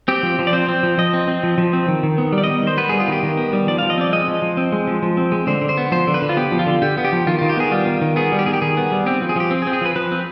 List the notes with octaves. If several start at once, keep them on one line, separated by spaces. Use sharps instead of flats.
C4 G4
F3
F3
D5
C4 C5
C4
F3
F3 D#5
C4
C4
F3
F3
C4
D#3
D#3
B3
G3
D5
D#3 D#5
D#3 C5
B3 B4
G3 G#4
F4
D#3 G4
D#3
B3
G3
F3 D5
F3 F5
D#5
C4 D5
G#3 D#5
F3
F3
C4
G#3
F3
F3
C4
G#3
D3 C5
D3
C5
B3
F3 C5
D3
B4
D3
F4
B3 G4
F3
F4
D3
D3 G4
B3
G4
F3
D#3 F4
D#3 F4
G4
B3 G#4
G3 F4
D#3
D#3
B3 G#4
G3
G4
D#3 G#4
G4
D#3 G#4
B3
G3
C4 G4
F3
G#4
F3 G4
C4
G#4
C4
G#4
F3 B4
F3 B4
C4